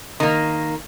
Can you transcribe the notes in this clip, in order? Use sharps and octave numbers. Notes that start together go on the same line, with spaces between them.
D#3 A#3